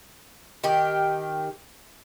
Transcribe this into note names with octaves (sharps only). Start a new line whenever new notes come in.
D#3 G4